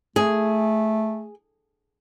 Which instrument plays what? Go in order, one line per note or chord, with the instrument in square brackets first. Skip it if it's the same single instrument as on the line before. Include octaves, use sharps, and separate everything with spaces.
[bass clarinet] A3 [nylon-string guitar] G#4